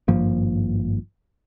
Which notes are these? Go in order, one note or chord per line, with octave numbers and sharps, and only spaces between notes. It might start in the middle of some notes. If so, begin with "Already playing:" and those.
G#1 G2 F3 A#3